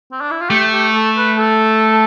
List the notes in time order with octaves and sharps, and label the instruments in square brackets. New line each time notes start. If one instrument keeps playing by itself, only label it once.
[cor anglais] C4
D4
E4
F4
[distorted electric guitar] A3 [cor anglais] G4
[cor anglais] G4
A4
B4
A4